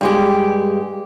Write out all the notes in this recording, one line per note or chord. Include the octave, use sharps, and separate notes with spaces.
G2 G#3 G4